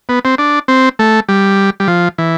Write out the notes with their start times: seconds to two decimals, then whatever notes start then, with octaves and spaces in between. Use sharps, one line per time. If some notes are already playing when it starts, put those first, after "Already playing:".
0.09 B3
0.25 C4
0.38 D4
0.68 C4
0.99 A3
1.29 G3
1.80 G3
1.88 F3
2.18 E3